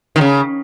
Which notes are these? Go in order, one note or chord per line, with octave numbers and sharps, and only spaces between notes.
D#3
C#3